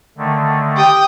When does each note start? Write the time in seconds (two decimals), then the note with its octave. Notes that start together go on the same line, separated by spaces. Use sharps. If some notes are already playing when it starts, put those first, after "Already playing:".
0.18 D3 D#3 A3
0.77 G4 G5 D#6